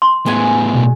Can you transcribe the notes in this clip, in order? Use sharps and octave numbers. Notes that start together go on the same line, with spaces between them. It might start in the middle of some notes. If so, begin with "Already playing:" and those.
C6
A2 G#3 B3 G#5
B2